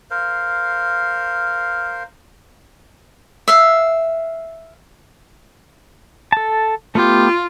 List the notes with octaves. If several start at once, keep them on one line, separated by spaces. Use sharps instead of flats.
A#4 C5 F5
E5 F5
A4 A5
A3 B3 F4 G4